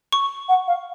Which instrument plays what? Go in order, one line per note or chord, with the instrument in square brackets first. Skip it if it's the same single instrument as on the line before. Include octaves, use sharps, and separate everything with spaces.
[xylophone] C#6
[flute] F#5
F5